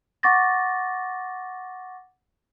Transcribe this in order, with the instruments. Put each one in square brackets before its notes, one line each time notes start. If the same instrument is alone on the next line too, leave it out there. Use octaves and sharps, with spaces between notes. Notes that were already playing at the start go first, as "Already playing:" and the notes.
[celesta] F#5 C#6 D6 A6 A#6